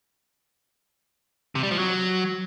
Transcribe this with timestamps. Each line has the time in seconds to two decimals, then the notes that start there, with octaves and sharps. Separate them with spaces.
1.55 C3
1.63 G3
1.71 F3
1.79 F#3